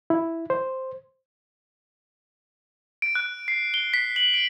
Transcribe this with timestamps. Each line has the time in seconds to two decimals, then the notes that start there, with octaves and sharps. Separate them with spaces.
0.10 E4
0.50 C5
3.02 D7
3.15 F#6
3.48 C7
3.74 G7
3.94 B6
4.16 F#7
4.34 D7